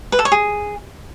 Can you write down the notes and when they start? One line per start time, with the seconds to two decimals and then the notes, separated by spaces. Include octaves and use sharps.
0.12 B4
0.19 A4
0.25 C#5
0.32 G#4